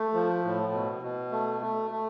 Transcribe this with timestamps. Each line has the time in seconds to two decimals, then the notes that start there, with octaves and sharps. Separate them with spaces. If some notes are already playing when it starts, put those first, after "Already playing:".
Already playing: A3
0.14 F3
0.44 A2
0.72 B2
1.02 B2
1.31 A3
1.61 A3
1.91 A3